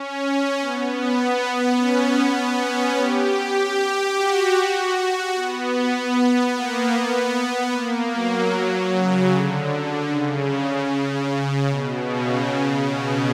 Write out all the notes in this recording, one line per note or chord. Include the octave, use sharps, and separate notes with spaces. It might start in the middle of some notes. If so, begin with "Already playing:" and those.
Already playing: C#4
C#4
B3
B3
C#4
B3
C#4
G4
G4
G4
F#4
B3
A#3
B3
A#3
F#3
C#3
D3
D3
C#3
B2
C#3
B2